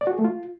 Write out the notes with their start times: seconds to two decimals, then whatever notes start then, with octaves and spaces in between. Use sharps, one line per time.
0.01 D5
0.07 F#4
0.13 G#4
0.19 A3
0.25 F4